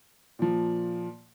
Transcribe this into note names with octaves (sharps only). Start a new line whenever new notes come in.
A#2 F3